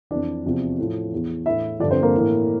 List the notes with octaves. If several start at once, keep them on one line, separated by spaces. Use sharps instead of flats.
F2 E3 D4 D5
E2 C3 F3
A2 F3
E2 E3
A2 E3 E4 E5
G2 D3 F3 D4 D5
C4 C5
A#3 A#4
A2 E3